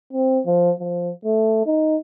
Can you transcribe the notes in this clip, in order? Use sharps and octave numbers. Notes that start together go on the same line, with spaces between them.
C4
F3
F3
A3
D#4